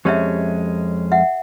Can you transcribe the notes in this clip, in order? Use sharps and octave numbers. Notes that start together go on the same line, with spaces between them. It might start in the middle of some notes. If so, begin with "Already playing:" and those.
F2 G#3 C#4 G4 C#5 E5
E5 F#5